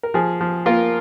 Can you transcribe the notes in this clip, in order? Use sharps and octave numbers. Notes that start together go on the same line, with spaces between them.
A#4
F3 G#4
F3
A#3 F4 A#4